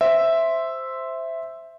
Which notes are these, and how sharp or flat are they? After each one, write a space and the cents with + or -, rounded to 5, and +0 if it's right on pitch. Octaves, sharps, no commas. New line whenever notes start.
C5 +0 E5 +0